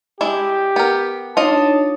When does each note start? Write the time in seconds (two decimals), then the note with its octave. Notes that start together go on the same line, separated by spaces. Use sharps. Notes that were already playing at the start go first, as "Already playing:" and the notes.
0.21 G#3 D4 E4 G4
0.76 B3 A#4
1.37 D4 D#4 F4 C#5 D#5 A5